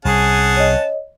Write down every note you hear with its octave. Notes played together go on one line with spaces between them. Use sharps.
C2 C#4 G#4 F#5 A5
C#5 D#5